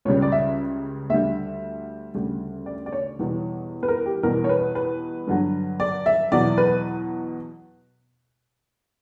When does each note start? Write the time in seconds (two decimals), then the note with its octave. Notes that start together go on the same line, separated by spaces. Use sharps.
0.05 C#2 C#3 G3 C#5
0.22 D5
0.32 E5
1.10 D2 D3 G3 E5
2.14 D2 C#3 G3
2.66 D5
2.86 D5
2.92 C#5
3.19 E2 B2 G3
3.83 B4
3.88 A#4
4.06 G4
4.23 E2 B2 G3 A#4
4.44 C#5
4.49 B4
4.75 B4
5.27 G2 D3 F#3
5.80 D5
6.06 E5
6.32 E2 B2 F#3 D5
6.58 B4